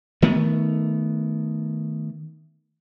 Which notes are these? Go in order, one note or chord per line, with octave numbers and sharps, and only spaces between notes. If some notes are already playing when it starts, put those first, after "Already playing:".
D#3 A3 B3